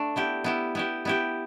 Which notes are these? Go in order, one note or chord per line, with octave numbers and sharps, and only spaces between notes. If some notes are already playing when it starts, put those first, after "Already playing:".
Already playing: A3 D4
B3 E4 G4
B3 E4 G4
B3 E4 G4
B3 E4 G4